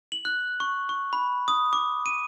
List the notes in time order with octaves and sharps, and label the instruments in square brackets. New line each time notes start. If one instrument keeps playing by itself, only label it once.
[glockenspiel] F#7
F#6
C#6
C#6
B5
D#6
D6
D#7